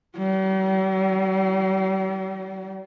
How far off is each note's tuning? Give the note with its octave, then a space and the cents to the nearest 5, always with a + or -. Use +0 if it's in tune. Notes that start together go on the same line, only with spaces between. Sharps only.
G3 -45